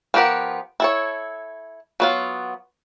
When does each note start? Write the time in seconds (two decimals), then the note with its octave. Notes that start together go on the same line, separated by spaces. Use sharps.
0.14 F3 B3 G4 A#4 F#5
0.80 E4 A4 C#5
2.00 F#3 B3 F4